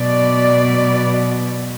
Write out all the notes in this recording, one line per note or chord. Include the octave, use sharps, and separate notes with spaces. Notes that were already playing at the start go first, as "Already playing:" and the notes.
Already playing: B2 F#3 B3 D5